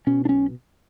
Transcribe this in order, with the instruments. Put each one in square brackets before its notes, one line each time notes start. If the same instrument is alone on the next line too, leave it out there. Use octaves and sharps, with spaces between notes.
[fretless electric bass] B2 C#4
D4
B1 C#4